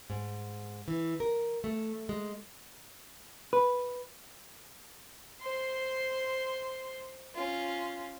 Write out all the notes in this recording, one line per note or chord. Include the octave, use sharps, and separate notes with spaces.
G#2
E3
A#4
A3
G#3
B4
C5 C6
C#4 F4